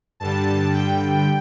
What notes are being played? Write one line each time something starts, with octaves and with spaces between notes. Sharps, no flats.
G2 D3 G3 A5
G5